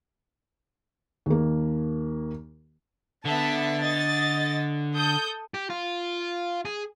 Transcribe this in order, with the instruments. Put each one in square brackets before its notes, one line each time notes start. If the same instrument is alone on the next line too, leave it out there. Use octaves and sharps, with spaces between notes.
[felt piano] D#2 A#3
[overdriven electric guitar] D3 [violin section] B3 E5 A5
[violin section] D#5 A6
A4 D#6 G6
[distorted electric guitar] G4
F4
G#4